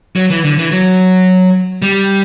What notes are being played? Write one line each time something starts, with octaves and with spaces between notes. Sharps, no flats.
F#3
E3
D3
E3
F#3
G3